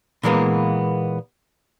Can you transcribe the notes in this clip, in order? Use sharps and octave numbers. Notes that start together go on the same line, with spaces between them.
A#2 E3 G#3 A#3 B3